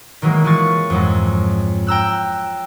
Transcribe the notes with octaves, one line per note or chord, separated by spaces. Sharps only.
D#3 E3 F#3 G#3 A#3
E3 G#3 F4 C#6 A6
F2 G#2 F#3 G#3
G5 A#5 E6 F#6